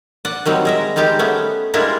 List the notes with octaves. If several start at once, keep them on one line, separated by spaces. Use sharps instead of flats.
D5 F#5
D#3 F#3 G3 C4
G#3 A#4 E5
D#3 G3 G#3 G4 D5
A3 B3 C#4
G3 G#3 A#3 D4 E4 F4